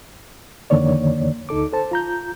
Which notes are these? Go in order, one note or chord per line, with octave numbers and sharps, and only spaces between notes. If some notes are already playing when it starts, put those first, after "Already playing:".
F2 D3 D#3 A#3 C#5 D5
D2 D#4 A4 D6
A4 C5 A5
F4 A#5 G6